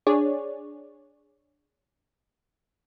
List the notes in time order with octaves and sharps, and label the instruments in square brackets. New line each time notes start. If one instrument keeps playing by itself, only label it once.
[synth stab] D4 G#4 C#5 D5